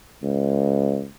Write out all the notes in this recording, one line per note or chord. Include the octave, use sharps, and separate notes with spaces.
C#2